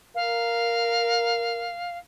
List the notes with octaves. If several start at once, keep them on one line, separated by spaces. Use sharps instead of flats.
A#4 F5